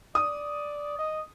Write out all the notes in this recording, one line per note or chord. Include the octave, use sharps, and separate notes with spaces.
D5 D#6
D#5